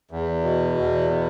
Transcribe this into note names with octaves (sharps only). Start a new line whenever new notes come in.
E2
B2
E2
B2